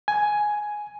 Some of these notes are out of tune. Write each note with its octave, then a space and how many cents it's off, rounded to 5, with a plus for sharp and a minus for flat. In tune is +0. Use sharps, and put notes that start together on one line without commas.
G#5 +10